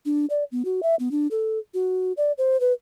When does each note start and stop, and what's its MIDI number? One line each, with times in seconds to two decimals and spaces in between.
0.05 0.26 62
0.30 0.44 74
0.52 0.63 59
0.65 0.81 66
0.83 0.95 76
0.99 1.11 59
1.11 1.27 62
1.31 1.58 69
1.74 2.13 66
2.17 2.32 74
2.38 2.59 72
2.60 2.73 71